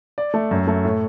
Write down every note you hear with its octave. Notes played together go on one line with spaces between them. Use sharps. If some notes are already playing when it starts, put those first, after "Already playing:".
D5
A3
F#2
A3
A2